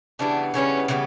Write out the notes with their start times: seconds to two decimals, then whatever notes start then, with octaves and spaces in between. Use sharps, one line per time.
0.19 C#3 E3 G3 B3 D4
0.54 C#3 E3 G3 B3 C#4
0.88 C#3 E3 G3 B3